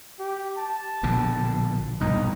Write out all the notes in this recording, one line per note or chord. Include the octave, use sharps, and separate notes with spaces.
G4
A5
A#1 B2 D3
A#1 G2 B2 D#4